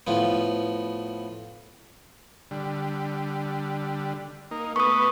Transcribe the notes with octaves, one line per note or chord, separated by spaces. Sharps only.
A2 F3 B3
D3 G3
A#3 D#4
A3 B3 B4 C#6 D#6